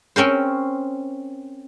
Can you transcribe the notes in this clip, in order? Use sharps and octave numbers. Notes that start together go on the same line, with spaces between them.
C4 C#4 A#4 C5